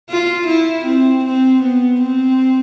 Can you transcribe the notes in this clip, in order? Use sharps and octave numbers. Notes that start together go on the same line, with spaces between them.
F4
E4
C4
C4
B3
C4